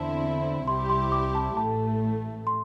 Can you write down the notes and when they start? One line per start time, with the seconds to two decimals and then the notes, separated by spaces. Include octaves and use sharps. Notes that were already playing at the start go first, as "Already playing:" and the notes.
Already playing: E2 D3 C4 E4 A5
0.67 C2 C3 G3 E4 G4 C6
0.90 C6
1.12 D6
1.35 A5
1.57 A1 A2 A3 A5
2.47 C6